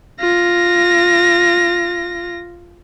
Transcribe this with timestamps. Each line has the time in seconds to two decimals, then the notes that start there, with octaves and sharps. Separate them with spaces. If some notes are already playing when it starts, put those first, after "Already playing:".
0.20 F4 A#6